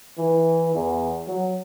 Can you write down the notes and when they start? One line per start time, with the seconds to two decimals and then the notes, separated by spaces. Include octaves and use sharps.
0.18 E3
0.75 E2
1.28 F#3